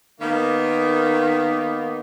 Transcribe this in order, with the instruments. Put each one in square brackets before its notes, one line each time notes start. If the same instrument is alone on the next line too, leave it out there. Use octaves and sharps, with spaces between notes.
[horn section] D#3 A#3 B3